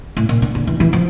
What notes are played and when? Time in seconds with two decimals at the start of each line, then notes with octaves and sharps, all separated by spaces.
0.17 A2
0.29 A#2
0.42 D3
0.55 D3
0.67 E3
0.80 E3
0.93 F3